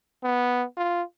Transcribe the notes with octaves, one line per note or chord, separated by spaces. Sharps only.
B3
F4